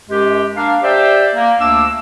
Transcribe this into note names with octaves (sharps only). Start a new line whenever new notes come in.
F#2 G#3 G4
A#3 D4 F5
G4 C5 D5 E5
A#3
D2 A3 A#3 D4 D6 E6